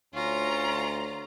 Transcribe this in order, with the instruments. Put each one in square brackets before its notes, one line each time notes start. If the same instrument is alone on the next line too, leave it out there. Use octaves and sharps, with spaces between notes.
[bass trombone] D2 [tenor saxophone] C#4 [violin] F4 A#5